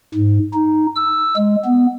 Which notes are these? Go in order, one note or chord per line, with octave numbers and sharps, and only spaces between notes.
G#2
D#4
E6
G#3
B3